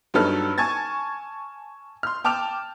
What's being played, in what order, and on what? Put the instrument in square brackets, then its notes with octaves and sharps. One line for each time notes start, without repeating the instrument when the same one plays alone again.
[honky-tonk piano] G2 F#3 D#4 A4 B4 F6
G#5 A5 C#6 G#6 A6
C6 F6
G5 A5 D6 F6 F7